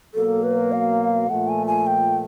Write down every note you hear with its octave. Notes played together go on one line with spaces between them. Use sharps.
B2 F#3 A#3 A4
B4
F5
A#2 F3 A3 F#5
G#5
G#5
G5